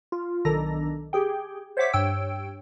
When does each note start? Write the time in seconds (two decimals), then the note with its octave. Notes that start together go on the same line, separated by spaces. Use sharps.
0.12 F4
0.45 B1 D#3 D4 A4 A#5 A#6
1.13 G4 G#4 G5
1.77 C5 C#5 E5 F#5 D6 B6
1.93 G2 C#5 G5 E6 D7